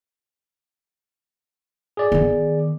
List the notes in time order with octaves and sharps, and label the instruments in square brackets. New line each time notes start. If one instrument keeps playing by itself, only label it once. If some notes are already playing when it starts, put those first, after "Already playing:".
[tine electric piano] G#4 D5
[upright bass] D#3 B3